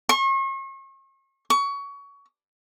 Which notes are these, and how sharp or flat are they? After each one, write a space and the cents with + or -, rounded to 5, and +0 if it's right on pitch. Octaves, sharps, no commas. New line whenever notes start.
C#6 -40
C#6 +25